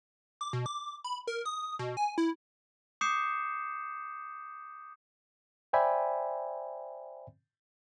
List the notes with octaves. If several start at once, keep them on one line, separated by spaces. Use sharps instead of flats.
D6
B2
D6
B5
A#4
D#6
B2
G#5
E4
D6 D#6 G6 C7 C#7 E7
C5 D5 E5 G5 G#5 B5